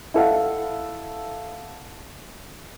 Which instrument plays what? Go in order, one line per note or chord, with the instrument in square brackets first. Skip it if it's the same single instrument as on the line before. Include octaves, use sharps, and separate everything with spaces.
[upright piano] E4 A4 F5 F#5